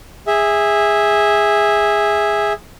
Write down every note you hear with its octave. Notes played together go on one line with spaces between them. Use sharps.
G#4 E5